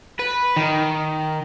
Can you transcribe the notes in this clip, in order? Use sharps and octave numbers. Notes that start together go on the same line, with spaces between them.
B4
D#3